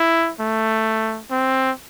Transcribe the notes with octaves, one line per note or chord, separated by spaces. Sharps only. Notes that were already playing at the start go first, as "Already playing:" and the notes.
Already playing: E4
A3
C4